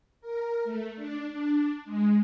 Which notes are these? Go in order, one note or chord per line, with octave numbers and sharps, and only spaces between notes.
A#4
A3
D4
D4
G#3